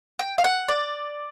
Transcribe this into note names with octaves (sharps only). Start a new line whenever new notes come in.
G5
F5
F#5
D5